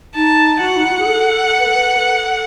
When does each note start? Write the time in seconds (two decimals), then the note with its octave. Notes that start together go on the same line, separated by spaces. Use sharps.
0.15 D#4 A5
0.60 F#4 F#5
0.77 D#4
0.84 E4
0.91 F#4
0.99 G#4
1.06 A4
1.59 B4
1.68 A4
1.75 B4
1.97 A4